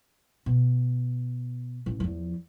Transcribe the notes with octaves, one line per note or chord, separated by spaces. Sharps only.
B2
A1
E2 F3